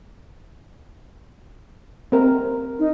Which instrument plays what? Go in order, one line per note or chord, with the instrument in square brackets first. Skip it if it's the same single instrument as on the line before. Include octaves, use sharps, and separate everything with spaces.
[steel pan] C4 A#4
[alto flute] D#4